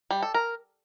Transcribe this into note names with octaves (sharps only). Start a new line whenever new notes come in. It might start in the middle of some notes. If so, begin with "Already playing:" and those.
G3
A4
A#4